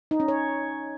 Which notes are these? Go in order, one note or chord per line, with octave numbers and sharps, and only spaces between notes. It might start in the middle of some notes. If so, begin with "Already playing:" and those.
D#4
C#4
C#5